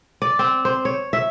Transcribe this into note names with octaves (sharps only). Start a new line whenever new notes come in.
D5
C4
C5
C#5
E5